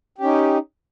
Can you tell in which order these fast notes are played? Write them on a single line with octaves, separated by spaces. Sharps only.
G4 C#4 D#4